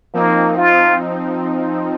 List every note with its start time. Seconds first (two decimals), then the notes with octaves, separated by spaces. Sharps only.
0.14 F3 A#3 C4 D#4
0.57 F4